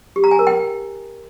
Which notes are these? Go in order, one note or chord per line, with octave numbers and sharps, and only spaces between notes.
G4
A#5
G#5
A#4
G5